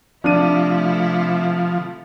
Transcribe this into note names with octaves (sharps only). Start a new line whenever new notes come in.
C3 F3 A3 D4 E4 D#7